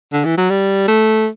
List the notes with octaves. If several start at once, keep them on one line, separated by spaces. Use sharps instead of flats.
D3
E3
F#3
G3
A3